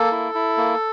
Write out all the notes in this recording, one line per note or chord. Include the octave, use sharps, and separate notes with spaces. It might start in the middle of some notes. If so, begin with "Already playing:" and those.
Already playing: A#3 A4
E4
E4
A#3